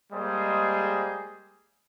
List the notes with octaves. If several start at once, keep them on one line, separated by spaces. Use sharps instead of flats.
G3 G#3 A#3 G#4 C5 D#5